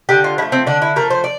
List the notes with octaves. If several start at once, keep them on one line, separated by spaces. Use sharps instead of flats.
D3 G4
F4
F3 A3 E4
C4
D3 D4
E4
F3 A3 A#4
C5
D5